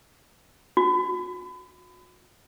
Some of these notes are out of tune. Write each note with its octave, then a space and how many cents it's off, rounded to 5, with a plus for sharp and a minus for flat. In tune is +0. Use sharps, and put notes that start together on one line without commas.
F#4 -40